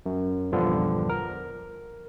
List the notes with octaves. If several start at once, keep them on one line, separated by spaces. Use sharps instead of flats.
F#2
A#1 E2 G2 D3 F3
A#4